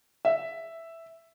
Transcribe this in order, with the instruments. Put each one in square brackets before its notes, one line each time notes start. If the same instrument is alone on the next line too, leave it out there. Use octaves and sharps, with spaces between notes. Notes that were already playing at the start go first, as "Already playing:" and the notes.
[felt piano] E5